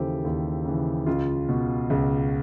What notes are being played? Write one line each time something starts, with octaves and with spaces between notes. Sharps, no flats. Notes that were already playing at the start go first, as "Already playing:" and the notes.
Already playing: D#2 C#3 E3 G4 A4 C5
D#2
C#3 E3
C#2 F4
B2
C#2